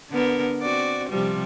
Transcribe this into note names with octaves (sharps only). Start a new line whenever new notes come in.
D3 B3 A#4
C4 F#4 D5
C3 F3 G3